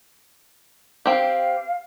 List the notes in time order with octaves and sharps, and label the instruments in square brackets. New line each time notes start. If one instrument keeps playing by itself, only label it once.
[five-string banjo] C4 G4 [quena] F5